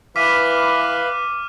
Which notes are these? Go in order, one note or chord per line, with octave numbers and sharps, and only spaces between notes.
E3 B4 F5 D6 F6 B6 D#7